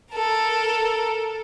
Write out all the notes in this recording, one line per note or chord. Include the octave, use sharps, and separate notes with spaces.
A4 A#4